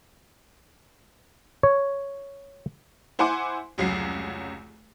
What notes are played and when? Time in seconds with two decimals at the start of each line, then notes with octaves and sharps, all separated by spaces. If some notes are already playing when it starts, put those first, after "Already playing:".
1.63 C#5
3.19 E4 C5 F#5 G#5 C6 D6
3.78 F1 C#2 F#3 C7